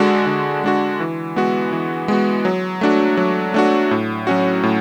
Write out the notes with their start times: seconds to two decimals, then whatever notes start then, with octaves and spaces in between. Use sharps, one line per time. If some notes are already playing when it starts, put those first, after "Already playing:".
Already playing: D3 G#3 D4 F#4
0.26 D3
0.64 G#3 D4 F#4
1.00 E3
1.36 G#3 B3 F#4
1.72 E3
2.08 G#3 B3 F#4
2.45 F#3
2.81 A3 D4 F#4
3.17 F#3
3.54 A3 D4 F#4
3.91 A2
4.27 F#3 C#4 F#4
4.63 A2